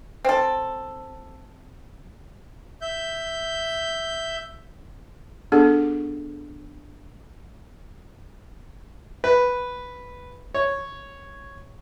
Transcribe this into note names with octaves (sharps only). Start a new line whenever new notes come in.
C4 A4
E5 G6
B3 D4 G#4 A4
B4
C#5